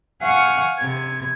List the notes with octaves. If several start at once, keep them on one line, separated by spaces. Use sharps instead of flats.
F5 F#5 G#5 C#6
C3 G#6